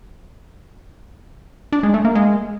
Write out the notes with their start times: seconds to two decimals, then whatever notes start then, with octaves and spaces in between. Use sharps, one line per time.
1.72 D4
1.83 G#3
1.94 A3
2.05 A#3
2.15 G#3